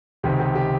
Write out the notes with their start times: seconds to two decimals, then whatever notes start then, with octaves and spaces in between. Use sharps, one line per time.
0.23 C#2 C3 D#3 G4
0.40 G4
0.55 G4